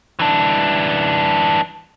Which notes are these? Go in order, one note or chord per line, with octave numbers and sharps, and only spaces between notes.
E3 D4